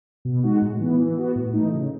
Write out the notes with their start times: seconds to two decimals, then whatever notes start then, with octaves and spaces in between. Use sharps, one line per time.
0.25 B2
0.43 G#3 D#4 F#4
0.62 A2
0.80 E3 B3
0.99 E3
1.17 B3 F#4
1.35 A2
1.53 E3 A3 D#4
1.72 C#3